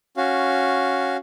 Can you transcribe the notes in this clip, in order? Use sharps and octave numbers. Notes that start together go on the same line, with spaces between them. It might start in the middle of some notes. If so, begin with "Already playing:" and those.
C#4 F#4 F5